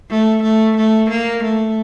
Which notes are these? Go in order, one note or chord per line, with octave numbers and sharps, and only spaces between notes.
A3
A3
A3
A#3
A3